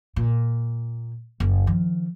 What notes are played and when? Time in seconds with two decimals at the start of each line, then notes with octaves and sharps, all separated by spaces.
0.16 A#2
1.40 F#1
1.67 D#3 F3